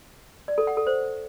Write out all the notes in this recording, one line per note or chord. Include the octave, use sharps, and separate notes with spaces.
D5
A4
F#5
A4
C5